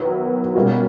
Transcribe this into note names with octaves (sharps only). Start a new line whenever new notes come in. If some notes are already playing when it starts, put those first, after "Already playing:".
Already playing: D#3 F#3 B3 E4
B2 G3 A#3 C#4 F#4